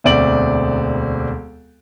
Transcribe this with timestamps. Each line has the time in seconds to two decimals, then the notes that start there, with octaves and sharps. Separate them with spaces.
0.04 E1 D2 C4 D5 D7 F#7